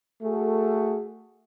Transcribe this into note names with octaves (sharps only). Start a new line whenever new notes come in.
A3 F#4 G#4 A4